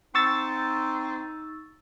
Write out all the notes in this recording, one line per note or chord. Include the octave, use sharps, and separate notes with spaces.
C4 D#4 C#6 E6 A6